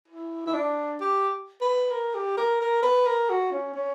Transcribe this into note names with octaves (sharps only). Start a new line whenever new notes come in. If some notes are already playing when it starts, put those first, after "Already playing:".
E4
E4
D4
G4
B4
A#4
G4
A#4
A#4
B4
A#4
F#4
C#4
C#4